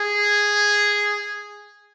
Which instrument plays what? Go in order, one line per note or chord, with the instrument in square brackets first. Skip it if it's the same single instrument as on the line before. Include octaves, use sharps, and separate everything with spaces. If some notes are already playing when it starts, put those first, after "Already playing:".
Already playing: [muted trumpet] G#4